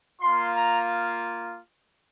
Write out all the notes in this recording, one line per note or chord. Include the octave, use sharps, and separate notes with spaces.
A#3 F4 C6
A#5